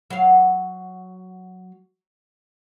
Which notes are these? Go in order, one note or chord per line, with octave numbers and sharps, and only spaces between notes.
F#3 F5